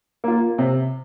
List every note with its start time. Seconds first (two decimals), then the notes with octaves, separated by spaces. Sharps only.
0.24 A#3 F4
0.58 C3